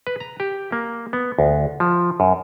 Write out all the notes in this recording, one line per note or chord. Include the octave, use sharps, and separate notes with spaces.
B4
A#5
G4
A#3
B3
D2
F3
F#2